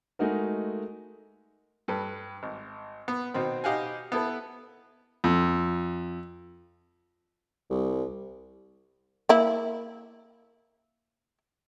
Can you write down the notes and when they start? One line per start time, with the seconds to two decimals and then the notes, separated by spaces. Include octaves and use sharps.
0.19 G#3 A3 D#4 F#4 A#4
1.88 G2 A4 B4
2.43 G#1
3.08 B3
3.34 B2 D#3 C4
3.64 B2 D#4 G4 F5 F#5 G#5
4.12 B3 E4 A4 B4
5.24 F2
7.70 C2
9.29 A#3 E4